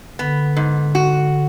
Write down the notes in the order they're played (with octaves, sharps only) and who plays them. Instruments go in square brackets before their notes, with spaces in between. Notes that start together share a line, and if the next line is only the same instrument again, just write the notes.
[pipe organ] D3 [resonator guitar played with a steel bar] B3
[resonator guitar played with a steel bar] G#2
F#4